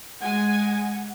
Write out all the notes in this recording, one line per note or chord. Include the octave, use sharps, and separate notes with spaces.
G#3 F#5 G#5